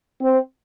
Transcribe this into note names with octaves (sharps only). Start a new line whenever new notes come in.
C4